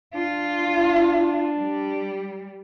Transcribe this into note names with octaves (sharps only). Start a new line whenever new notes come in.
D4 F4
G3